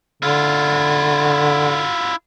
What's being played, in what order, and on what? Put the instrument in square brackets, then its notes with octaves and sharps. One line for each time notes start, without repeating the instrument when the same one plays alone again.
[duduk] D3 [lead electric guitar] E4 F4